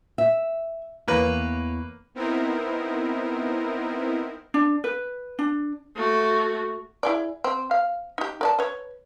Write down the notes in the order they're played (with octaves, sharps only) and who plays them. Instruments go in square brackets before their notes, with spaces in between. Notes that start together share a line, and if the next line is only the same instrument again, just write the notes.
[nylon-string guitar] E5
[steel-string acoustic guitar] E2 C#5 [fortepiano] A#3 B4
[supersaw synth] B3 C4 D#4 E4 A#4
[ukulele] D4
B4
D4
[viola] A3 F#4
[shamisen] E4 G#4 D5
C4
F5
D#4 G4
A#4 D5 A5
B4 C#5